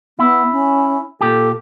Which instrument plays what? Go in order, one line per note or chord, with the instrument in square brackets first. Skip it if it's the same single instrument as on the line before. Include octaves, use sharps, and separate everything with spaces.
[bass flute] B3 [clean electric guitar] E4
[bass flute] C#4
[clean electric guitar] A#2 G4 [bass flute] A4